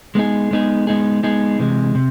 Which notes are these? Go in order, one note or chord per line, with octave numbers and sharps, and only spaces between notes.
G#3 B3 D#4 G#4
G#3 B3 D#4 G#4
G#3 B3 D#4 G#4
G#3 B3 D#4 G#4
C3 E3 G#3
C3